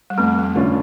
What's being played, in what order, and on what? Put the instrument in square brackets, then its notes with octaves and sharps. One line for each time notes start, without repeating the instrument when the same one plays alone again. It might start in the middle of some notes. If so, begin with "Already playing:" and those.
[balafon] G3
[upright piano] F2 [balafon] A3
[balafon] G3
A3
[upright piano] D3 A3 C#4 F4